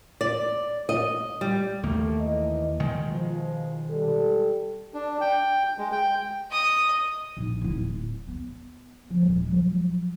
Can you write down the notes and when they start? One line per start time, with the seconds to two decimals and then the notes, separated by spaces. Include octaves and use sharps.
0.21 D5
0.89 D#5
1.41 G3
1.83 D#2 D#3 A3 A#3
2.21 E3 D#5
2.80 B2 D#3 G#3
3.11 F3
3.90 G3 A4
4.94 D4
5.21 G5
5.79 G#3
5.92 G5
6.51 D#5 D#6
7.37 A#1 D#4
7.62 D1 E4
8.28 B3
9.09 F3 A3
9.21 D#1 G#3
9.48 F3 F#3